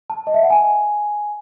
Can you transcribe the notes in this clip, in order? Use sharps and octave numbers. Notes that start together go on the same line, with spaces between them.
A5
D#5
E5
F#5
G#5